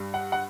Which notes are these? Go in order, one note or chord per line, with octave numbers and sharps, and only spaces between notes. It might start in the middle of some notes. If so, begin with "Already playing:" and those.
Already playing: G2 G3
F#5
F#5